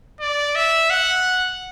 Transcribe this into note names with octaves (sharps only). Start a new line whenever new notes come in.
D5
E5
F#5